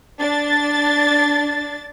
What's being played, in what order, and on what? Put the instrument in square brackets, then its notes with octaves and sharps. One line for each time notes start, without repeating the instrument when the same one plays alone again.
[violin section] D4 A6